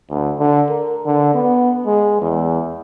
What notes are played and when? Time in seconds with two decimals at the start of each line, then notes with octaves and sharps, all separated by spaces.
0.11 D2
0.39 D3
0.70 A#4
1.06 D3
1.34 B3
1.86 G#3
2.22 E2